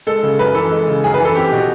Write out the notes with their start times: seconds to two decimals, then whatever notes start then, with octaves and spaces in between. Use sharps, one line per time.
0.07 G#3 A4
0.23 C#3
0.39 F#2 B4
0.54 E3 A4
0.72 G#3
0.88 C#3
1.04 F#2 G#4
1.14 B4
1.19 E3
1.25 A4
1.35 C4 G4
1.52 B2